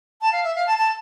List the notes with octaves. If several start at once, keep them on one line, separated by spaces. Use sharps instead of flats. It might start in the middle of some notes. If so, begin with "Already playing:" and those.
A5
F5
E5
F5
A5
A5